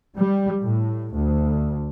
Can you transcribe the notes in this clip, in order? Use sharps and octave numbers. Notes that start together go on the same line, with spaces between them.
G3
A2
D2